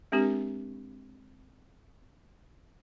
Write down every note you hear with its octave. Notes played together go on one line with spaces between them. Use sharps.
G#3 C4 D4 G4 A#4